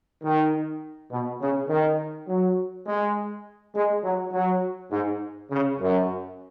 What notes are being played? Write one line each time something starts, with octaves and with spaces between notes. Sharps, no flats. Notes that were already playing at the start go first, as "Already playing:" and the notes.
D#3
B2
C#3
D#3
F#3
G#3
G#3
F#3
F#3
G#2
C#3
F#2